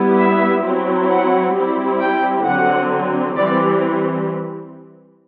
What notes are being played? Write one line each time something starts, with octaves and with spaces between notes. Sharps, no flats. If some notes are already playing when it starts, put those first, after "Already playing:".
Already playing: G3 B3 E4
E5
F#3 C4 E4
F#5
G3 C4 E4
G5
D3 F#3 C4 F#5
E3 G3 C4 D5